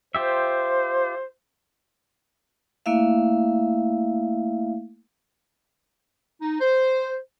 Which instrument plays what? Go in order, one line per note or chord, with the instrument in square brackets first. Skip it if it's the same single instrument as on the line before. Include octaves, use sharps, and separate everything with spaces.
[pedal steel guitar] F4 G4 E5 [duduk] C5
[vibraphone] A3 A#3 E4 E5 F5
[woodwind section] D#4
C5